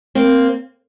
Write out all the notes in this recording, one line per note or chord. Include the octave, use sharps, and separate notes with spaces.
A#3 C4